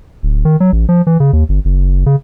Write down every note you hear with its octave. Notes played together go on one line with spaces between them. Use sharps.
D1
D#3
F#3
A1
F3
E3
C#3
D#2
G1
F#1
C#3